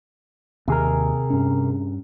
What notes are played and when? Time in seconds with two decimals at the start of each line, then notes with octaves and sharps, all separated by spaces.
0.68 D#2 C3 G#4 A#4
1.30 G2 C#4